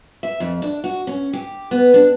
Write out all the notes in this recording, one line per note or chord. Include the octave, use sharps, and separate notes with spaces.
E5
F2
D4
F#4
C#4
G4
B3
D4